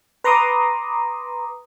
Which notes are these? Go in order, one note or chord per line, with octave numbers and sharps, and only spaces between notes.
B4 A#5 C6 D6 D#6